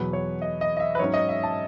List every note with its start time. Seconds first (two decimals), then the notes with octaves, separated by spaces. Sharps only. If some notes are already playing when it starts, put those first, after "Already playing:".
Already playing: E2 B2 F#3 B4
0.13 C#5
0.42 D#5
0.61 D#5
0.77 D#5
0.80 E5
0.95 B4
0.99 G#2 F#3 C#4 C#5
1.14 D#5
1.29 E5
1.43 A5